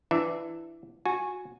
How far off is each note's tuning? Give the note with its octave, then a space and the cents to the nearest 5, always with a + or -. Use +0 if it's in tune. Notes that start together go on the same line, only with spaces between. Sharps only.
E3 +15 D4 +25 E5 +0
F#4 -20 G#5 +0